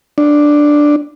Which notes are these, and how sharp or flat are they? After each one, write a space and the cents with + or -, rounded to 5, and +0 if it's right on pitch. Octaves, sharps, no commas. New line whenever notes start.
D4 +5